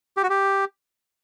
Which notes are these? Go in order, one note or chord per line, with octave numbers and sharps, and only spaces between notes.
G4
F#4
G4